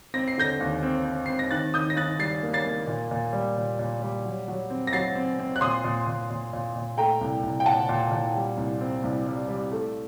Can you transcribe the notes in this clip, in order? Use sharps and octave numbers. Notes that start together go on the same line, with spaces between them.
C4 A#6
C7
D3 G6 A#6
D#2
C4
C4
C4 C7
A#6
D#3 F#6 A6
D#3 D#6 G6
A#6
D#3 F#6 A6
G3 A6 C7
A#3
A6 C7
A#3
A#2
A#2
G3
A#2
A#2
G3
F#3
F#3
C4
A#6
F#3 A6 C7
C4
C4
F#6
A#2 C6 D#6
A#2
A#2
A#2
A#2
A#2
A3 G5 A#5
C2
C2
G5
A#2 F#5 A5
A#2
A#2
G3
C2
C4
C2
G3
G3
A3